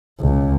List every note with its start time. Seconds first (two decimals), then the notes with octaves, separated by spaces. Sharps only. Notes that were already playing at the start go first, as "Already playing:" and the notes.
0.20 C#2